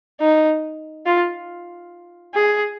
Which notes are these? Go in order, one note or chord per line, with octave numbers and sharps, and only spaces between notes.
D#4
F4
G#4